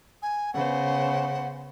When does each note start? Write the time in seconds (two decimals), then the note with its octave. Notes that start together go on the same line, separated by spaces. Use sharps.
0.22 G#5
0.54 C#3 B3 C5 F#5